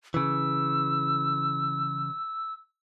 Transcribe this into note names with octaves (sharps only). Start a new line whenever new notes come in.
C#3 E3 E6